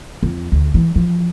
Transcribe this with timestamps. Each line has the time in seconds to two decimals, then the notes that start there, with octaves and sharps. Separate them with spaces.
0.23 F2
0.52 D2
0.74 E3
0.96 F3